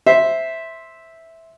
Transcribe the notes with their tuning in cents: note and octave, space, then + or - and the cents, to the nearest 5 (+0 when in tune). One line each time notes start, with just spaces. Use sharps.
C5 +0 E5 -5